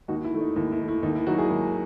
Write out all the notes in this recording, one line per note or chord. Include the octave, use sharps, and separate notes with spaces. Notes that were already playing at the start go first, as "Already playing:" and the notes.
D#2 D#4 F#4
E4
D#3 A3
D#4
D#2 E4
E4
D#3 A3
E4
D#2 D#4
E4
D#3 F#3 D#4 F#4
E4 G#4
D#2